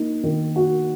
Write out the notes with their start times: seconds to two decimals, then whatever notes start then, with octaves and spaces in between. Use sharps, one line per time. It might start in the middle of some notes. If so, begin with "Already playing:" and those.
Already playing: A#3 D#4
0.23 D#3
0.56 F#4